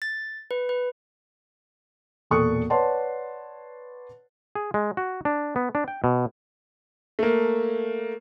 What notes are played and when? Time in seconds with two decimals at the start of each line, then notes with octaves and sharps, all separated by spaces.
0.02 A6
0.51 B4
0.69 B4
2.31 E1 A#2 A4 C#6 D#6 F#6
2.70 B4 C#5 D5 F#5 A5 C6
4.56 G#4
4.74 G#3
4.97 F#4
5.25 D4
5.56 B3
5.75 D4
5.88 G5
6.04 B2
7.19 A3 A#3